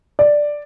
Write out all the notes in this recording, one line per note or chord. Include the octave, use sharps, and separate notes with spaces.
D5